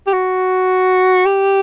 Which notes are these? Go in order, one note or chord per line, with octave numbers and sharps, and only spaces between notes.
G4
F#4
G4